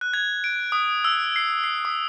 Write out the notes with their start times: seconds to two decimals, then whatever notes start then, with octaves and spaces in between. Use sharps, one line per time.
0.01 F#6
0.14 G#6
0.44 D7
0.72 D#6
1.04 E6
1.36 C7
1.64 C7
1.85 D#6